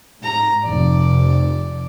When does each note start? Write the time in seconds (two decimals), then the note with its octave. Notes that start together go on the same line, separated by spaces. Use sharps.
0.23 G#2 A#5
0.64 F1 F2 D5